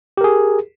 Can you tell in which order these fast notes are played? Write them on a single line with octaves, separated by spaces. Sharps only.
G4 A#4 G#4